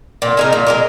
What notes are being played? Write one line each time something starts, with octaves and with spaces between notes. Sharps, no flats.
A#2
G#3 D#4 A#4
A#2
G#3 D#4 A#4